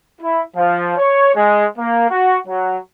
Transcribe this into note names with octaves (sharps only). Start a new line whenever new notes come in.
E4
F3
C#5
G#3
A#3
F#4
F#3